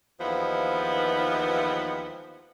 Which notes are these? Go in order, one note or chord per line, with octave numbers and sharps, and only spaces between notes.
D#2 E3 F3 G#3 B3